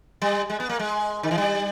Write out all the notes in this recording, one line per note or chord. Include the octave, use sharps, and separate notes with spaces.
G3
G#3
B3
A#3
G#3
D#3
E3
G3